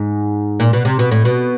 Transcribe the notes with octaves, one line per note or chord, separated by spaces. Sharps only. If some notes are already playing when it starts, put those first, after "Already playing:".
Already playing: G#2
A#2
B2
C3
B2
A2
B2